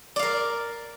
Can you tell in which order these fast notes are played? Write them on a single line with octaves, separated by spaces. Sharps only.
D5 F5 A#4